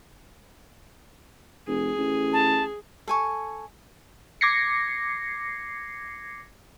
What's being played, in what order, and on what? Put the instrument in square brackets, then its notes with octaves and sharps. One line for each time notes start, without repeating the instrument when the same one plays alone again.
[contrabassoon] F1 [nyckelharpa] G#4
[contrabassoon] A1
[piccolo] A5
[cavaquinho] A4 G#5 C#6
[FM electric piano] D6 G#6 A#6 C7 C#7